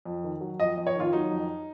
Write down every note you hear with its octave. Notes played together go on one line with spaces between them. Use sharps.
F2
D#3
F#3
F2 D#5
F2
C#5
D#3 F4
F#3 D#4
F2